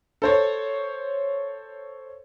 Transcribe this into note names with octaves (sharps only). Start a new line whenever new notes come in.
A4 C5 C#5